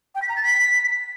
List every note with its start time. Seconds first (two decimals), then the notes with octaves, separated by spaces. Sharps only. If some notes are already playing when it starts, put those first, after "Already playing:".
0.15 G5
0.22 B6
0.29 A#5
0.36 A6
0.43 B6